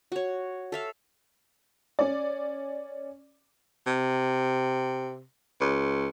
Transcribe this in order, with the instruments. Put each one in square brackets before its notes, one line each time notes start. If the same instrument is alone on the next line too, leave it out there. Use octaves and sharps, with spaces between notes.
[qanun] F#4 C#5
A4 E5 F5
[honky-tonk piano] C#4 D5
[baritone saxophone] C3
C#2